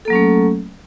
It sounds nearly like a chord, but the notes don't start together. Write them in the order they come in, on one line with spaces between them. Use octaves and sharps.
A4 A#3 F#3 C#4 A3